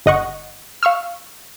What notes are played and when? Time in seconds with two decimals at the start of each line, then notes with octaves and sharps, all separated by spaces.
0.06 G1 D#5 F#5 C#6
0.83 F5 C#6 E6 F6